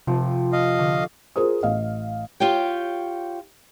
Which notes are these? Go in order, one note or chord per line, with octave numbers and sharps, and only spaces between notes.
F1 C3 F3
D#5 F5
D3 C#6
F4 G#4 A#4 C5 D#6
A1 D#5 F5
F4 G4 C#5 G5